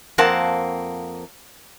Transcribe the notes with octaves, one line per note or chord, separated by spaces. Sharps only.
F2 A#3 C4 F#5 A5